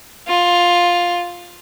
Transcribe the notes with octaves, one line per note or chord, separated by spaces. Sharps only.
F4